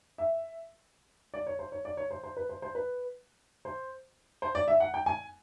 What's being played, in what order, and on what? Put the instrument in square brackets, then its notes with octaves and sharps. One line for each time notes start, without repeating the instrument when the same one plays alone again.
[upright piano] E5
D5
C#5
C5
C#5
D5
C#5
C5
C5
B4
C5
C5
B4
C5
C5
D5
E5
F#5
G5
G#5